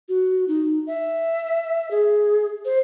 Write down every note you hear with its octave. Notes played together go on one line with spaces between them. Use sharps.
F#4
D#4
E5
G#4
C5